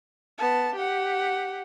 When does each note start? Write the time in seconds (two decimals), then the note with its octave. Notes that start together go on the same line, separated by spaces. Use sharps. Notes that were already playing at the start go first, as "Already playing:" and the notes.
0.39 B3 A5
0.76 G4 F#5